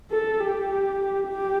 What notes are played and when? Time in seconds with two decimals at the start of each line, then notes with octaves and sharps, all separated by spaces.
0.11 A4
0.41 G4
1.28 G4